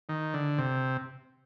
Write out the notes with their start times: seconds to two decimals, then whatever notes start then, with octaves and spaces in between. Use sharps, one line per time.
0.09 D#3
0.34 D3
0.58 C3